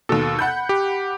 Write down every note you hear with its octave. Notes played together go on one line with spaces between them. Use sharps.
D#2 B2 A4
F#5 B5 G6
G4